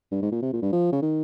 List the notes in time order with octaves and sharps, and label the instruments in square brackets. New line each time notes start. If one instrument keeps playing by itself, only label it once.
[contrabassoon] G2
G#2
A#2
C3
A#2
G2
F3
C#3
D#3